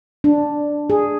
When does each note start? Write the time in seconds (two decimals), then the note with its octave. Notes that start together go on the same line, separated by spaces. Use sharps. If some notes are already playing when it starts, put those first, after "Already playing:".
0.24 D4
0.90 G#4